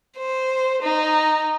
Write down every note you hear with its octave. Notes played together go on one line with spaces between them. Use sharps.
C5
D#4